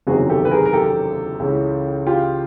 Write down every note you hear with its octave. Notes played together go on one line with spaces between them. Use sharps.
F#1 E2 C3 D#3 F#3 F#4 G#4
G4 A4
B4
G#4 A#4
A#4
G4 A4
C#2 C#3 E3
F4 G4